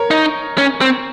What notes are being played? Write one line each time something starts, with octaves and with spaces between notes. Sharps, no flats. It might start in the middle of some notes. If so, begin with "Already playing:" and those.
Already playing: A#4 C#5
D#4
C#4
C4